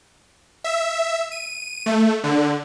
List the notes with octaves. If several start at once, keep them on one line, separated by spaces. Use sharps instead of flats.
E5
D#7
A3
D3